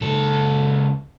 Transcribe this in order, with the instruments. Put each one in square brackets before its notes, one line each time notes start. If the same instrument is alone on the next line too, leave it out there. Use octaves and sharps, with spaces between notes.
[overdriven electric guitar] C#2 A4